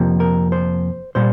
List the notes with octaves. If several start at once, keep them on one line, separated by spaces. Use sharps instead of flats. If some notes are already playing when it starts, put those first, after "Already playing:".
Already playing: F2 C3 F3 A#3
A#4
C5
A#2 G3 C5